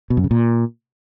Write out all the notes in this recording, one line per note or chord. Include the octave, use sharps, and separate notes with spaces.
B2
F#2
C#3
A#2